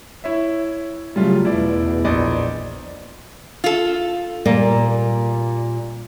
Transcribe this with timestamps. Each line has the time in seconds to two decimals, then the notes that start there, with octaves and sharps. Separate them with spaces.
0.24 E4 C#5 E5
1.16 C#3 F#3 G3 A3 F4
1.45 E2 B2 E4 D5
2.04 A#1 D5 D#5
3.64 F4 A4
4.46 A#2 G3 A#3